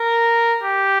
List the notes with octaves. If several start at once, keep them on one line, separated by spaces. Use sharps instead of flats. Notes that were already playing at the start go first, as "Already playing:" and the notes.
Already playing: A#4
G4